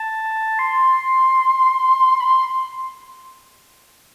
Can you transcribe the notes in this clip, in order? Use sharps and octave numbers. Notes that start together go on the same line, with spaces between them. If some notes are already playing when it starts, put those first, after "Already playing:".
Already playing: A5
C6
B5
C6